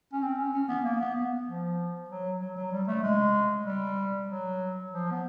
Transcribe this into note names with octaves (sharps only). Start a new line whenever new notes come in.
C#4
C4
C#4
C#4
B3
A#3
B3
B3
F3
F#3
F#3
F#3
G3
A3
G#3
G3
F#3
F3
B3